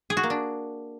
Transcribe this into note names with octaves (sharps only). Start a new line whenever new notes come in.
G#4
F#4
A#3
D4